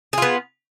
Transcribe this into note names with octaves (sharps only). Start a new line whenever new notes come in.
B3 F4 G#4